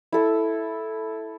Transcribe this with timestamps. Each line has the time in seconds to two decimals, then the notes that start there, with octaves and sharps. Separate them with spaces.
0.12 E4 A4